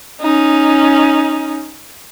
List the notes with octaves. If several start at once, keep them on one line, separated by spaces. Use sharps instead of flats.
C#4 D#4